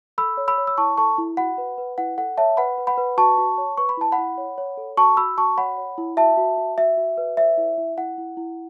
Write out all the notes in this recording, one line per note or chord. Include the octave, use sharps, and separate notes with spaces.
A4 B5 E6
C#5
B5 E6
C#5
E6
E4 A5 C#6
A4 A5 C#6
E4
F#4 F#5 B5
B4
B4
E4 F#5
A4 F#5
C#5 E5 A5
B4 F#5 B5
B4
F#5 B5
B4
F#4 A5 C#6
F#4
C#5
B4 C#6
B5
E4 A5
F#5 B5
E4
C#5
C#5
A4
F#4 A5 C#6
F#4 B5 E6
F#4 A5 C#6
C#5 F#5 B5
C#5
E4
F#4 E5 A5
F#4
F#4
F#4 E5
F#4
B4
C#5 E5
E4
E4
E4 F#5
E4
E4